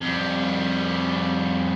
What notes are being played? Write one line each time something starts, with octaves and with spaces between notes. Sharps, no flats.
F2 G3